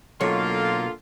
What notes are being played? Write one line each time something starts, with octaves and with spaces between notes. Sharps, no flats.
B1 D3 F#3 A#3 F4 C#5